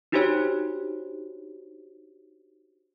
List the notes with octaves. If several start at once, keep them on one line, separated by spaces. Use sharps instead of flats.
D4 D#4 F#4 G4 C5 C#5